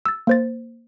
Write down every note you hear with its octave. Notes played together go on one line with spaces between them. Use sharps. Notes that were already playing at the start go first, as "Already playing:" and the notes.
E6 A6
A#3 C5 A6